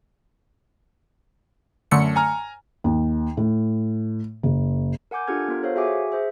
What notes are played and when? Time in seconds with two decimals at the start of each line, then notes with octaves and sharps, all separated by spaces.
1.91 F#2 D3 A3 C#7
2.16 G#5 A#5 F6
2.84 D#2
3.37 A2
4.43 F#1
5.11 A#4 F#5 G#5 D6 G6
5.27 D4 F4 G4 A4 F6 G#6
5.48 B3 F4 A#4
5.63 A4 C5 C#5 F5
5.76 F#4 G#4 E5 F#5 G#5 D6
6.12 G#4 C5 E5